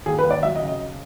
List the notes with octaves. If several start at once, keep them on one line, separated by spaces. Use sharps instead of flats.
D#2 G#4
B4
D#2
D5
F#3 E5
D#5
C#3
D#5